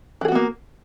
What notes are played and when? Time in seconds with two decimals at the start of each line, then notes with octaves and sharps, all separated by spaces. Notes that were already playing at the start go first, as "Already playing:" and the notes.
0.21 E3
0.25 G#4
0.28 F#4
0.32 B3
0.35 A#3